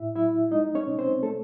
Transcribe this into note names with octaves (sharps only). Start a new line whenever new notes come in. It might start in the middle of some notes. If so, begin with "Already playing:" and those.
Already playing: A2 E4 E5
F#3 E4 E5
G#3 D#4 D#5
C#4 C#5
C3
C4 C5
A3 A4